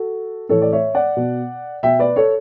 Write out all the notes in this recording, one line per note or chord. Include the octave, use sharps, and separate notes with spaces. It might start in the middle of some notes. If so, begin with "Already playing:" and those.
Already playing: F#4 A4
A2 E3 A4 C#5
D5
C#5 E5
D5 F#5
B2
B2 E5 G5
B4 D5
A4 C#5